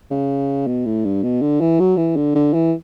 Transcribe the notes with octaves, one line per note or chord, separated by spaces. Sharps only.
C#3
B2
A2
G2
B2
D3
E3
F#3
E3
D3
D3
E3